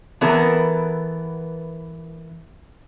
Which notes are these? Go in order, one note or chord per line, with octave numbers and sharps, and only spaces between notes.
E3 B3 A4 A#4